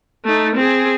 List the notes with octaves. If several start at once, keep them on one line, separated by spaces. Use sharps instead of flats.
A3 D#4
C4 G#4